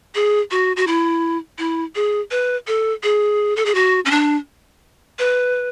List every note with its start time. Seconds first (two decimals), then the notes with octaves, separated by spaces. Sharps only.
0.15 G#4
0.51 F#4
0.76 F#4
0.87 E4
1.58 E4
1.95 G#4
2.31 B4
2.67 A4
3.03 G#4
3.56 A4
3.65 G#4
3.75 F#4
4.05 C#4
4.11 D4
5.19 B4